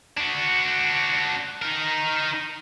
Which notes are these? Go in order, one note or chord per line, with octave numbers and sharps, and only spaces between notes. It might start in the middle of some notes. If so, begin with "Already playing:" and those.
D4 F#4
D#4 A#4